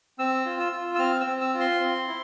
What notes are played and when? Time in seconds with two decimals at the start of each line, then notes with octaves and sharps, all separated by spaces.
0.19 C4 E6
0.46 F4
0.60 E6
0.72 F4
0.95 E6
0.99 C4 F6
1.20 E6
1.27 C4
1.41 E6
1.54 F4
1.60 C6
1.80 C4
2.07 E4